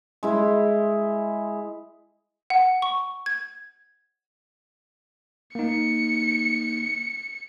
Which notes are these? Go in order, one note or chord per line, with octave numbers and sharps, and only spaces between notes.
G#3 E4 B5
F#5
C#6
G#6
A#3 D#4 C#7